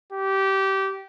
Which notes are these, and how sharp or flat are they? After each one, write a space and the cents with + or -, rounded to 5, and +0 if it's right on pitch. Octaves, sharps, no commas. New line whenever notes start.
G4 -20